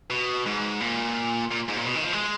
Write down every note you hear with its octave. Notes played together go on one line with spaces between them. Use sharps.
B2
G#2
A#2
A#2
G#2
A#2
B2
D#3
F3
G#3